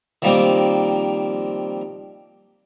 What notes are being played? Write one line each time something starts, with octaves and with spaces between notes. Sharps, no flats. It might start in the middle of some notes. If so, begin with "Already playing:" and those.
D#3 F3 G3 A#3 C4